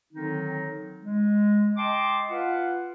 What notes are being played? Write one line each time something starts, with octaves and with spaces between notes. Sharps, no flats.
D3 D#3 F#3 C4 D#4
G#3
D#5 G5 A5 C6 D6
F4 B4 F5 F#5